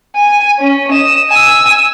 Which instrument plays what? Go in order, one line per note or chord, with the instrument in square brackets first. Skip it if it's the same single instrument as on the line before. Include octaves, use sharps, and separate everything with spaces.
[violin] G#5
C#4
D#5 E7
G#5 E6